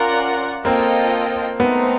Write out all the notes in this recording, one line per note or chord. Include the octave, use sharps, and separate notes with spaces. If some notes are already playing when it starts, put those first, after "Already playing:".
Already playing: C#4 F4 A#4 D5 F#5
A#3 C4 F4 A4 C5 D#5 G5
A3 B3 C4 D#4